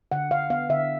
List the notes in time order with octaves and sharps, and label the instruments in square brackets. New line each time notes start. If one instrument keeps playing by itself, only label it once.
[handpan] D3 F#5
D3 F5
B3 F5
D3 E5